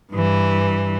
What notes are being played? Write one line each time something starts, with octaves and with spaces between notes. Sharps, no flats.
G2 E3